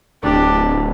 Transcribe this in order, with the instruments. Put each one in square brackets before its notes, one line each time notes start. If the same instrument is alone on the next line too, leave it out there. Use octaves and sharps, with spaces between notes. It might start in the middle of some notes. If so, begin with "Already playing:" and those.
[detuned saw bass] D1 [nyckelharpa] D4 G4